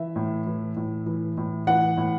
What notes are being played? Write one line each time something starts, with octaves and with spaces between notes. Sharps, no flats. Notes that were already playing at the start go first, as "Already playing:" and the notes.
Already playing: E3 E5
A2
E3
A2
E3
A2
E3 F#5
A2